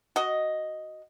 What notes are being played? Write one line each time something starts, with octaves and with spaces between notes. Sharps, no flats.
F#4 D#5